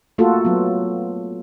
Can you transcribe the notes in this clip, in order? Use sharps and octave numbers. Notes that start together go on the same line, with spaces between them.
A3 A#3 F4 F#4 A4
F#3 B3